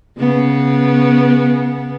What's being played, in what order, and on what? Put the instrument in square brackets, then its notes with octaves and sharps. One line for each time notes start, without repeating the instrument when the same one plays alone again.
[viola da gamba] C#3 B3